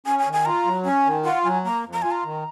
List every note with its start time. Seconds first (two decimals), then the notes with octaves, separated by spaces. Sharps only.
0.06 C#4 G#5
0.19 G#5
0.26 D#3
0.33 G#5
0.45 F4 A#5
0.65 F#3
0.85 C#4 G#5
1.06 D#3
1.25 F4 F#5
1.44 F#3 G#5
1.65 A#3 A#5
1.84 F2
1.93 A#5
2.02 F4 G#5
2.11 A#5
2.24 D#3